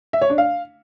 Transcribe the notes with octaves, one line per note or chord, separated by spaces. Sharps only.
E5
C#5
D4
F5